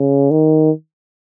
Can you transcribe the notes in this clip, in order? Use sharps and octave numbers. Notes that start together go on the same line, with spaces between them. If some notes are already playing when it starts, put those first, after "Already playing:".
Already playing: C#3
D#3